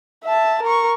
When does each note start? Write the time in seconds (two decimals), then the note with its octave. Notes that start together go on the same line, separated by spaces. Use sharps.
0.24 E5 A5
0.63 A#4 C#6